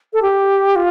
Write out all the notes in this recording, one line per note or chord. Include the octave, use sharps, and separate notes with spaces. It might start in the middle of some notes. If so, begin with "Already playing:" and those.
A4
G4
F4